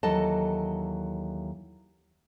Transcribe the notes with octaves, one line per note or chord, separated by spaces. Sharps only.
D#2 E3 F#3 A4 D#5 A5